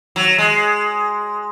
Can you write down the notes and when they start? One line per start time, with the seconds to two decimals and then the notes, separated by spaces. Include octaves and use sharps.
0.16 F#3
0.38 G#3